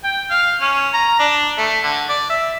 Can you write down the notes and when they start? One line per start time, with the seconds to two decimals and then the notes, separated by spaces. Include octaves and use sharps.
0.04 G5
0.31 F5
0.61 C#4
0.94 A#5
1.19 D4
1.58 A3
1.83 D3
2.09 D5
2.30 E5